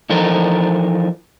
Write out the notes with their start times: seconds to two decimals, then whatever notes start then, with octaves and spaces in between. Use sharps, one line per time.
0.10 E3 F3 D#4 A4 A#4 C5